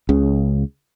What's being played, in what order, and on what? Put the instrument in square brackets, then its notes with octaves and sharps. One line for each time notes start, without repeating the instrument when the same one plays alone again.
[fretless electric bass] C#2 C#3